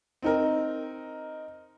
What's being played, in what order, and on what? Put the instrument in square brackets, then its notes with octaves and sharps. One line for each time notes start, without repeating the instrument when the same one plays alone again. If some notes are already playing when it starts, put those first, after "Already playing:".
[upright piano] C4 D#4 A#4